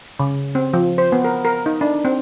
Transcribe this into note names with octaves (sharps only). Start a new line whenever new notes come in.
C#3
C4
F3
C5
B3
A#4
A#4
D#4
D4
C4